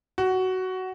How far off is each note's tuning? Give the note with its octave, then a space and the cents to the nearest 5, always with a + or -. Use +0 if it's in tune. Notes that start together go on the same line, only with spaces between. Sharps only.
F#4 +10